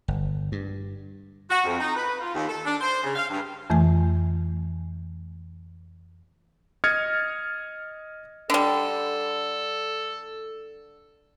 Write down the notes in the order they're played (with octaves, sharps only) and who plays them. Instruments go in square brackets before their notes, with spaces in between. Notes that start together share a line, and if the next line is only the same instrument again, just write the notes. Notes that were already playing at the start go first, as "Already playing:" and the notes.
[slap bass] G1
G2
[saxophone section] F#4
F2
D#4
B4
F4
D#2
A4
D4
C5
C#3
F5
G2
[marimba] F2 E3 A3 G#5
[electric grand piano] D#5 D#6 F6 G#6 A6 C#7
[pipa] D3 G3 [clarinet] A4